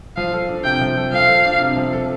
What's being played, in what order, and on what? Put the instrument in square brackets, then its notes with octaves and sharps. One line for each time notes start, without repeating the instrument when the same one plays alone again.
[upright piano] F3 [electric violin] F5
[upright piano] A4
D4
[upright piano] C3 [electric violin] G5
[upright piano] F3
A4
[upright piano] F3 [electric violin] F5
[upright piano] A4
D4
C3
F3
A4